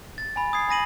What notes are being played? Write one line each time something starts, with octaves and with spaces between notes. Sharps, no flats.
A6
G#5 B5
D#6 G#6 C7
G#5 B5 A#6 D#7 F#7